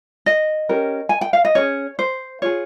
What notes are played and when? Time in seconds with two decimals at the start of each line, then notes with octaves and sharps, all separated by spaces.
0.26 D#5
0.69 C#4 G4 A#4
1.09 G#5
1.21 G5
1.33 F5
1.45 D#5
1.55 C#4 G#4 C#5
1.99 C5
2.42 F4 G#4 C#5